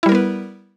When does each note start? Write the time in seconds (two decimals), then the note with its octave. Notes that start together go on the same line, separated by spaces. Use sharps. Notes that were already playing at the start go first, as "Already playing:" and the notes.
0.03 E4
0.06 G3
0.09 A#4
0.12 B3
0.15 B4